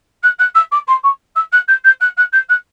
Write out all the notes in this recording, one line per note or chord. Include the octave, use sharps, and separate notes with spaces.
F#6
F#6
E6
D6
C6
C#6
E6
F#6
G6
G6
F#6
F#6
G6
F#6